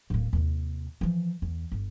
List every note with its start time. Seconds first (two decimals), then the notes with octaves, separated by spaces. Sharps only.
0.10 D1 A#3
0.33 D#2 C3
1.01 E3 F3
1.42 E2
1.72 G1